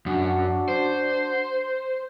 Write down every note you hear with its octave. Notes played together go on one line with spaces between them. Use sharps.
F#2 D4 F#4 F#5
C5